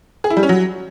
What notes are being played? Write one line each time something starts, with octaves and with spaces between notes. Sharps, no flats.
G#4
E4
G3
C#4
F#3